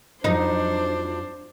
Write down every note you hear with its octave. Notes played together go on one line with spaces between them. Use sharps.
F2 F3 F#3 D4 D#4 C5